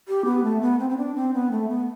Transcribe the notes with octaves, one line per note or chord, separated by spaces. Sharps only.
G4
B3
A3
B3
C4
C4
D4
C4
B3
A3
B3